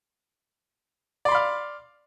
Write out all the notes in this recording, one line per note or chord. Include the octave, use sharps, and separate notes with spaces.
D5 F5 B5 C6